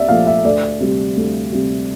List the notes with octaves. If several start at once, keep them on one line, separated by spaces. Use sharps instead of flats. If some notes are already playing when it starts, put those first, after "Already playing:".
Already playing: C2 D5 E5
A#2 F3 A3 F5
E5
D2 D5
C3 G3
D2
C3 G3